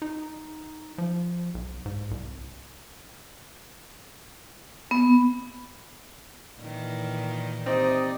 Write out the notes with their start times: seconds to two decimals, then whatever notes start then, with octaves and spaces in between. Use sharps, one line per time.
0.02 D#4
0.98 F3
1.55 B1
1.86 G#2
2.11 C2
4.91 B3
6.60 A#2 D#3 E3
7.66 C3 C4 D#4 D5 D#5 D#6